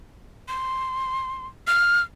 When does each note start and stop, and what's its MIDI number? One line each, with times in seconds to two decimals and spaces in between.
0.48 1.47 84
1.67 2.02 89